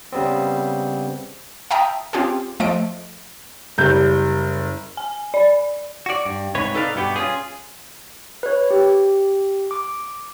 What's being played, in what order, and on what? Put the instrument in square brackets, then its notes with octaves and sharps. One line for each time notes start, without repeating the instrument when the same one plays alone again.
[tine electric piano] C#3 G3 B3 C4
[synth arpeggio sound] E5 F5 G5 A5 A#5 D#6
C4 C#4 F4 G4 G#4
F3 A3 D#5 D7
[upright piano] F#1 G3 G6
[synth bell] G#5
D5
[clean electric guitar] F#4 D5
G2
G#2 C3 B4 C#5
D#4 A4 B4 D5 F5
G2 B2 B3 G4
C#4 F4 G#4
[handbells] B4 C#5
G4
D6